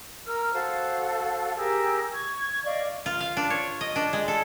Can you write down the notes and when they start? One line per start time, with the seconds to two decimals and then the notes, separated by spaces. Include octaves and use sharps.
0.26 A#4 E6 F6
0.53 F#4 A4 C5 F5
1.56 G4 G#4 A#4 E6
2.12 C#6 G#6
2.65 D5 D#5 F5 C#6
3.06 F4
3.20 F5
3.37 D4
3.50 C#5
3.81 D#5
3.96 D4
4.13 G#3
4.28 A4